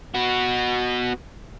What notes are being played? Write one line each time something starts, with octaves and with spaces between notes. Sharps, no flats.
B3 F#4